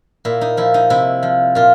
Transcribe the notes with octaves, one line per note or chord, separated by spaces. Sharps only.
A#2 E4
D#4
F3 E4
D#4
C3 E4
F3
A#2 F4